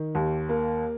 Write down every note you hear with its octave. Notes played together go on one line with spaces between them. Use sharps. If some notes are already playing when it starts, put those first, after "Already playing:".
Already playing: D#3
D#2
A#3